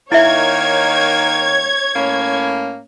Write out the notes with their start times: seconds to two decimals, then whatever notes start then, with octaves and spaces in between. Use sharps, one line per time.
0.12 D#3 A#3 D#4 E4 C#5 E5 G#6
1.96 A2 A#3 C#4